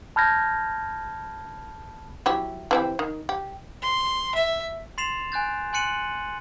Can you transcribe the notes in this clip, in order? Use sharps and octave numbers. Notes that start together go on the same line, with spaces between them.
A5 B5 F6 G6 G#6 A#6
F#3 E4 G4
E3 C4 G4
D#3
G4
C6
E5
C6 A6 C7 E7 F7
G#5 F#6 G6 A6
G#5 C6 F#6 C#7 D#7 F#7